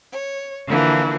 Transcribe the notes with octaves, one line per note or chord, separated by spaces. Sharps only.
C#5
D3 E3 F3 A#3